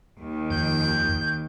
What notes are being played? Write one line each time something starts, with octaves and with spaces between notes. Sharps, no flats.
D#2 D#3
F2 G6